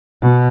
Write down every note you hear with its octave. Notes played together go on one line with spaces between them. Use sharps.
B2